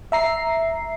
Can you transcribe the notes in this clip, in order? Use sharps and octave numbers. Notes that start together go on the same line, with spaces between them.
E5 A#5 C7